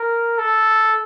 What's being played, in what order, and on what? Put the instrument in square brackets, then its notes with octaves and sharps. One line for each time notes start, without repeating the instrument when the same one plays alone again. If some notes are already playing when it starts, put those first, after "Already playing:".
Already playing: [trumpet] A#4
A4